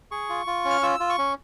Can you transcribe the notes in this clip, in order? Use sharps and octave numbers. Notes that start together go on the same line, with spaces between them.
G#4 C#6
F4
F4
C#4
F6
F4 E6
F4
C#6
C#4